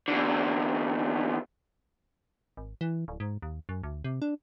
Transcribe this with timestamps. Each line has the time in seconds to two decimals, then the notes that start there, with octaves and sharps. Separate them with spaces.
0.08 E2 D3
2.57 G#1
2.81 E3
3.08 D1
3.20 G#2
3.42 D#2
3.69 F#2
3.83 D2
4.04 C3
4.22 D4